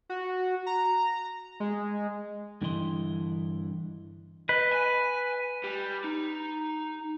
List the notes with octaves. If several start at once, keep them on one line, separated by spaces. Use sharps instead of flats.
F#4
A#5
G#3
G2 D3 E3 E4 D#5 C6
B4 D#5
G#5
G3
D#4